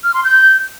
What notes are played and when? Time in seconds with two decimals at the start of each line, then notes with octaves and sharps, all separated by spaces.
0.04 F6
0.14 C6
0.24 G6